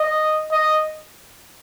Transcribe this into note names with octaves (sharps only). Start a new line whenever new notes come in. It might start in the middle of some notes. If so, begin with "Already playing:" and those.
Already playing: D#5
D#5